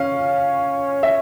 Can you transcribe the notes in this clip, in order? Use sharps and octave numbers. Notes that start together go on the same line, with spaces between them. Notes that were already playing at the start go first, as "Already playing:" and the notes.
Already playing: C#4 F5
E5